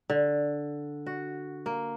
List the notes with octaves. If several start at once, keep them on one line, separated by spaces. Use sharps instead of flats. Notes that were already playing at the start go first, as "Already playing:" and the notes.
D3
F#4
A#3